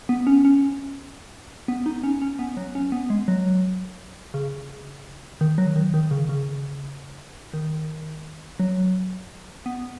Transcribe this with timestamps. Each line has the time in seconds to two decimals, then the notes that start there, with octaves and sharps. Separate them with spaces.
0.09 B3
0.27 C#4
0.45 C#4
1.68 B3
1.86 D#4
2.03 C#4
2.22 C#4
2.39 B3
2.57 F#3
2.75 C#4
2.92 B3
3.10 G#3
3.28 F#3
4.34 C#3
5.41 D#3
5.58 F#3
5.76 D#3
5.94 D#3
6.11 C#3
6.29 C#3
7.53 D#3
8.60 F#3
9.66 B3